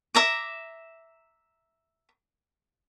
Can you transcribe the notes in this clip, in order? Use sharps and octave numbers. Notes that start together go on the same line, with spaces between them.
E5 A#5 D6